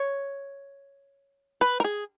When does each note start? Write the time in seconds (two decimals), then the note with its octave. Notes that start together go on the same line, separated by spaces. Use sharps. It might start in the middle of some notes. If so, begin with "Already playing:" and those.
Already playing: C#5
1.61 B4
1.80 A#4
1.84 G#4